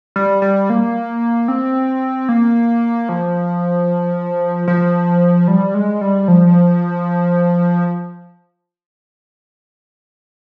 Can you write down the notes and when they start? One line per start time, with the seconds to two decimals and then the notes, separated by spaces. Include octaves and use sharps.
0.16 G3
0.42 G3
0.70 A#3
1.48 C4
2.29 A#3
3.09 F3
4.68 F3
5.48 G3
5.74 G#3
6.01 G3
6.28 F3